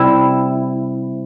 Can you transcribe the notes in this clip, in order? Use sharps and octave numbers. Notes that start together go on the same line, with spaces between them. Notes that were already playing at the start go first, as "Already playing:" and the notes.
Already playing: C3 G3 E4